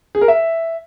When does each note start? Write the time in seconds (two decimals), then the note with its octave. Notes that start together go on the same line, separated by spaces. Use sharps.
0.15 G#4
0.21 A#4
0.28 E5